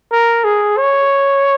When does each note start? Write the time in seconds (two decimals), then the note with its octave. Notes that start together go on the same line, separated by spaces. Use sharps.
0.12 A#4
0.44 G#4
0.77 C#5